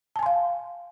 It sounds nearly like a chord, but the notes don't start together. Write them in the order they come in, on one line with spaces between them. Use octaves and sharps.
A5 G#5 C6 F5